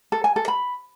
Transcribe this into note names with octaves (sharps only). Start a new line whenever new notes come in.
A4
G#5
A4
B5